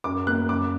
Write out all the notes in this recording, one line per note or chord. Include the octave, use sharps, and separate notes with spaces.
F#2 D6
A#3 F#6
F#1 D6